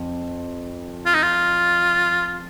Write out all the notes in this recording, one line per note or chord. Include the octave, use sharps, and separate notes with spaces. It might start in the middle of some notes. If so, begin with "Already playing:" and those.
Already playing: F2
F4
D#4
F4